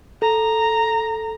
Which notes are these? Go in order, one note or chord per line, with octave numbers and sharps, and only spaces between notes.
A4 A#5